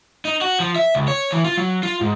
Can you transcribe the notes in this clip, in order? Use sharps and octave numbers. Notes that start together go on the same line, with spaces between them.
D#4
F#4
F3
E5
C#2
C#5
E3
F4
F#3
F4
G#2